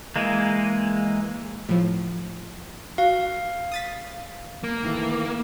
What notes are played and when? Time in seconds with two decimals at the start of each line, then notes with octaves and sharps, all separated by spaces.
0.16 E3 G#3 A#3
1.69 A2 F3
2.98 F#4 F5
3.72 D#6 A6 B6
4.64 A#3
4.83 D#3 E3 A3